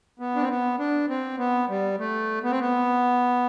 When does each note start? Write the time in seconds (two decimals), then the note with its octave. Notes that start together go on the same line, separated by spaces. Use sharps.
0.20 B3
0.35 D4
0.42 C4
0.49 B3
0.79 D4
1.09 C4
1.39 B3
1.69 G3
1.99 A3
2.43 B3
2.51 C4
2.60 B3